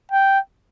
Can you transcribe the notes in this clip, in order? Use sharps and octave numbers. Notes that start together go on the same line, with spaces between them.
G5